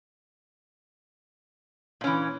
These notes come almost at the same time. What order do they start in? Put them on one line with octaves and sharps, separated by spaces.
A#2 C#4 E3